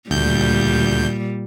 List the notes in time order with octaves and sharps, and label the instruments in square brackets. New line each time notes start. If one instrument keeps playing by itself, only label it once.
[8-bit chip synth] D2 G6 [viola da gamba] A#2 G3